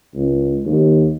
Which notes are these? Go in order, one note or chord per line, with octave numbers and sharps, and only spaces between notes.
C#2
D#2